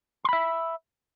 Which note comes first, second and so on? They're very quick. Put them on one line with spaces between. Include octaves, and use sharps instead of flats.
C6 B5 E5